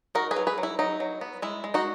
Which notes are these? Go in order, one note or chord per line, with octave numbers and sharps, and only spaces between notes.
D#4 F#4 A#4
G#4 B4
F#3
G#4 B4
F#3
E4
F#3 D#4
F#3
B3
G#3 E4
G#3
D#4 F#4